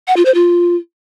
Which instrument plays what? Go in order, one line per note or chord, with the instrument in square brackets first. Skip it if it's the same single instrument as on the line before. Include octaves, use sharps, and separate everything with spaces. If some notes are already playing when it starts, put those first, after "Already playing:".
[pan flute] F#5
F4
C5
F4